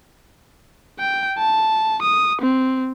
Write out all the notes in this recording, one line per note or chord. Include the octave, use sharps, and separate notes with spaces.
G5
A5
D#6
C4